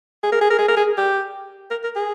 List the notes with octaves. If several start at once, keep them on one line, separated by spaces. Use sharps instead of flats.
G#4
A#4
G#4
A#4
G#4
A#4
G#4
G4
A#4
A#4
G#4